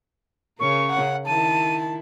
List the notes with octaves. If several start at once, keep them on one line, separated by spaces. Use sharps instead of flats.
C#3 C#4 A#4 C#6
F#5
D#3 E4 A5 D#7